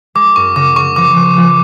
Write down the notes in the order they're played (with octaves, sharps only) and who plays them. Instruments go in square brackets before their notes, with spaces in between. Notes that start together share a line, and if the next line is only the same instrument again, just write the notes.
[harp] G#3 [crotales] D6
[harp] F#2 [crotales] C#6
[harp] C#3 [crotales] D6
[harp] C#3 [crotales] C#6
[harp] F3 [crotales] D6
[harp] F3
F3